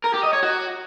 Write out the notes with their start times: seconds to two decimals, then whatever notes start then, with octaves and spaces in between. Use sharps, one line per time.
0.04 A#4
0.14 G4
0.23 D#5
0.33 C#5
0.43 F#4